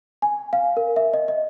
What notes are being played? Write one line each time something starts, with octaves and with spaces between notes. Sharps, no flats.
G#5
F5
A#4
E5
D#5
D#5